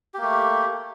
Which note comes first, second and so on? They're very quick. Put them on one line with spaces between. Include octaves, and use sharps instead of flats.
G4 A#3 A3